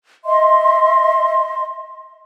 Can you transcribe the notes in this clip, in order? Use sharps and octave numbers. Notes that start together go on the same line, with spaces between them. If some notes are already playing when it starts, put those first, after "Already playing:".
D#5 E5 C6